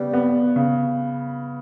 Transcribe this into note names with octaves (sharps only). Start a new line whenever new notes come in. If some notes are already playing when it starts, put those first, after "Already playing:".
Already playing: C#3 G3 B3
B3
C#3